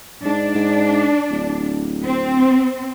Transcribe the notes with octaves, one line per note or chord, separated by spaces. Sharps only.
G#2 D4
G#2
D1
C4